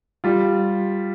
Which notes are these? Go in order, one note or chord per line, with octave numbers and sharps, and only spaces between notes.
G3 F4